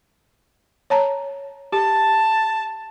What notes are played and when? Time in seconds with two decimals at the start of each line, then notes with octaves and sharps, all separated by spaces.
0.90 C#5 A5 A#5
1.72 G4 A5